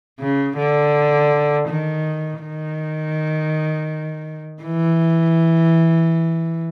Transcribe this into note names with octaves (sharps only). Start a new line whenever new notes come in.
C#3
D3
D#3
D#3
E3